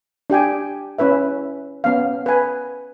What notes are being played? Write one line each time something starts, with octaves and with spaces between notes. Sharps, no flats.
D4 G4 G5 G#5
C#4 E4 B4 E5
B3 C#4 F5
B4 G#5